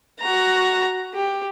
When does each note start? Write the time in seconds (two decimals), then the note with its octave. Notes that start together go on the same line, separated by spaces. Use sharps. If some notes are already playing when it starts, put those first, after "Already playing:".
0.20 F#4 A#5
1.14 G4